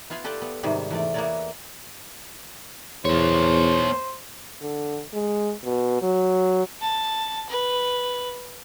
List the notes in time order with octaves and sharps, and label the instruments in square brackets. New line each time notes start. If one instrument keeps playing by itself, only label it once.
[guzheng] B3 F4 F5 G#5 B5
G4 A4 B4 D5 G5 A5
B3
G#2 C3 D#3 G3
E2 A3 D5
A#3 B3 E4 A#4 C#5 D5
[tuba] E2 [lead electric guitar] B3 C#5 [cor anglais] C5
[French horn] D3
G#3
B2
F#3
[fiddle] A5
B4